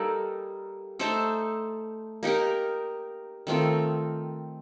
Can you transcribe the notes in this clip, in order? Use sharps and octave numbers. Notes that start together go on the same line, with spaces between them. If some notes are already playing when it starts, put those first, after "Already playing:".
Already playing: G3 A#3 D#4 A4
A3 D#4 A4 C5
A#3 D#4 G4 A#4
D#3 A3 C4 F4